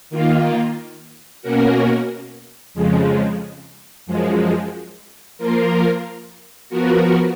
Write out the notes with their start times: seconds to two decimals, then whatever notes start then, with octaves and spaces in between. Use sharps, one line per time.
0.10 D#3 A#3 F4
1.42 B2 A#3 C#4 F#4 A#4
2.74 F2 C#3 F3 G#3
4.06 F#2 F3 G#3
5.38 F3 A#3 F4 A#4
6.69 F3 B3 F#4 A#4